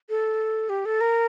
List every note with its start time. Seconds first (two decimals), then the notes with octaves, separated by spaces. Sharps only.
0.09 A4
0.69 G4
0.86 A4
1.01 A#4